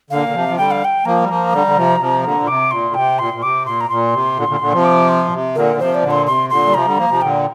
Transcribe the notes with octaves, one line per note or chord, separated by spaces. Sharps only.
A#2 D3 F5
D3
C3 F3
F3
D3 G3 G5
F5
G5
F3 A#3 A#5
G3
F3 A#3
D3 G3
D3
C3 F3
C3 F3
A#2 D3
A#2
C3 D6
A#2 C6
D3
C3 G5
A#2 C6
A#2
C3 D6
A#2 C6
A#5
A#2 C6
C3
A#2 D3
A#2 D3
A#2 D3
C3 F3
D6
C6
A#2
C3
A#2 D3 A#4
C3 F3 C5
D5
A#2 D3
C6
C3 C6
A#2 D3 C6
G3
C3 F3 A#5
D3 G3
F3 A#3
C3 F3
A#2 D3 G5